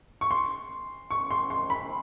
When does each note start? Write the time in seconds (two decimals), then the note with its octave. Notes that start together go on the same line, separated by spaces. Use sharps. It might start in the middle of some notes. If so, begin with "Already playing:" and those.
0.21 C#6
0.31 C6
1.11 C#6
1.31 C6
1.50 C6
1.70 B5